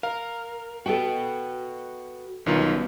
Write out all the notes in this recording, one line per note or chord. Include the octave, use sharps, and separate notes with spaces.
A#4 F5
F#4 A4 B4 G5
B1 D#3 G3 B3 C#4 F4